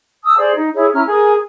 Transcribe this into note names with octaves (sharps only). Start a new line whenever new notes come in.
A5 D#6 E6
G#4 C5 D5
D#4
E4 G#4 C#5
C#4 E4 A#5 F6
G#4 A#4 G#5